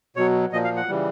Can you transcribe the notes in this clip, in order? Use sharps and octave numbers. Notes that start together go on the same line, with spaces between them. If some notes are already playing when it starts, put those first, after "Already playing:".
B2 F#3 C#5
A#2 F3 D#5
F5
F#5
C#3 E3 G3